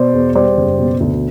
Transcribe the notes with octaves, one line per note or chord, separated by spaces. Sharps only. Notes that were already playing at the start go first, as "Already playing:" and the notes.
Already playing: B2 C5 D5
E2
G3 C5 D5
F#1
B2
D2